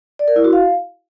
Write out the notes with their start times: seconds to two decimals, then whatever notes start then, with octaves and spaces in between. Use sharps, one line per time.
0.19 D5
0.28 A#4
0.36 E4
0.44 F#4
0.53 F5